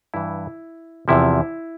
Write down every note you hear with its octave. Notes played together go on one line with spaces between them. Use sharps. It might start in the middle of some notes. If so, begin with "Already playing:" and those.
G2 E3 E4
E2 C3 F3 E4